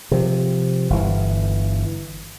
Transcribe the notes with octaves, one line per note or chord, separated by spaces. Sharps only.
C3 F3
G1 E3